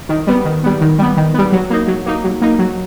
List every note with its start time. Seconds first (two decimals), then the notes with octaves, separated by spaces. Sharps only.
0.09 D#3
0.27 G3 B3
0.45 D#3
0.63 G3 B3
0.81 D#3
0.99 G3 B3
1.17 D#3
1.34 G3 B3
1.52 F#3
1.70 A#3 D#4
1.88 F#3
2.06 A#3 D#4
2.24 F#3
2.42 A#3 D#4
2.59 F#3